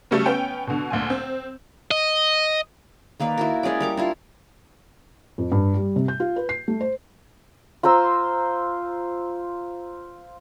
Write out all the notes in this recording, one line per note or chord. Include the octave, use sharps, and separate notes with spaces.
C#3 F#3 G3 A3
B3 C#4 G5
B2 D3
D2 A#2 G#5
C4
D#5
D#3 A#3 B4 D5
E4 F#4 A#4
G#3 C#4 G#4 D5
G3 A#4 D6
D4 E4 F4
F2
G2
G3
C3
G6
F4
B4
C7
A3
C5
F4 C5 A#5 E6